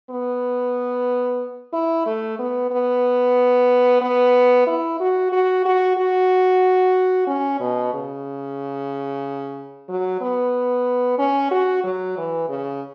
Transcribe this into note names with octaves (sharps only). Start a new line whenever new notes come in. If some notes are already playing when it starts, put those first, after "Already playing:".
B3
E4
A3
B3
B3
B3
E4
F#4
F#4
F#4
F#4
C#4
B2
C#3
F#3
B3
C#4
F#4
F#3
E3
C#3